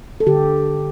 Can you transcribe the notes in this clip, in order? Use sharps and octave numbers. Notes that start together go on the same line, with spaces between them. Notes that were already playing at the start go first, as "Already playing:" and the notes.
A4
D3 G4